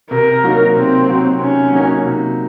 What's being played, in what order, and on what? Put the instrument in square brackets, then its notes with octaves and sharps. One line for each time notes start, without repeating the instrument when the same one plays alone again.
[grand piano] C3 [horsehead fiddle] A#4
[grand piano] F#3 A#3 D#4
[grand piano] C3 [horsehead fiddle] C4
[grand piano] F#3 A#3 D#4
[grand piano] C3 [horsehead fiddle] C#4
[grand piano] F#3 A#3 D#4
C3